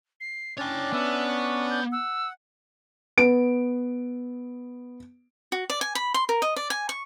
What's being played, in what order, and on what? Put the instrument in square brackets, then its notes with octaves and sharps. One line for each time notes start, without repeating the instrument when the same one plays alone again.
[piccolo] C7
[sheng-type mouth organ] C#4 D4 D5 [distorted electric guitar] C#5 G5 [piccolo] A6
[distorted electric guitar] B3 [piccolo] E5
[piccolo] C#6
G6
[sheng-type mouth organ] F#5 [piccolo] E6
[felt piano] B3 D7
[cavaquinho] F#4
D5
G#5
B5
C6
A#4
D#5
D5
G#5
C#6